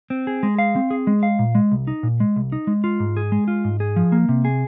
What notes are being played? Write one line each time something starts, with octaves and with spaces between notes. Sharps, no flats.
C4
G#4
G#3
F5
C4
G#4
G#3
F5
A#2
G#3
C2
D#4
A#2
G#3
C2
D#4
G#3
F4
G#2
G#4
G#3
F4
G#2
G#4
F3
A#3
C3
G#4